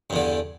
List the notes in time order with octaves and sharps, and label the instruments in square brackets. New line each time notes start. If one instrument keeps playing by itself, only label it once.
[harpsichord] G2
E2
D3